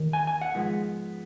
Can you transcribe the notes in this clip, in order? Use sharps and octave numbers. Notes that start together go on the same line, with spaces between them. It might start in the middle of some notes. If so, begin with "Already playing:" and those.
Already playing: D#2 D#3
G#5
G#5
F#5
G#2 F3 G#3 B3